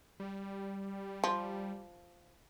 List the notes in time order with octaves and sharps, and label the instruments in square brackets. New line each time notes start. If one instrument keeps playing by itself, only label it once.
[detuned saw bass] G3
[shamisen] F3